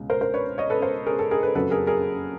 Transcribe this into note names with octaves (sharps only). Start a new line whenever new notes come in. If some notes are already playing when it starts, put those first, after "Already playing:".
Already playing: C#2 B2 G#3
A#4 C5
A#4 C5
B4 C#5
C#5 D#5
A4 B4
A#4 C5
G#4 A#4
A4
G#4 A#4
A4 B4
F#1 F2 C#3 F#3 A4 B4
G#4 A#4
G#4 A#4